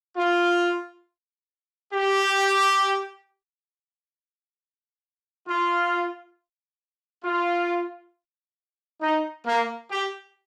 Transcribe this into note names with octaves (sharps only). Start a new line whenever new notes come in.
F4
G4
F4
F4
D#4
A#3
G4